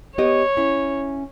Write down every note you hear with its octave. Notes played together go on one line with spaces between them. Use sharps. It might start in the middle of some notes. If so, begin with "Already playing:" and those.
B3 G4 C#5 D#5
C#4 E4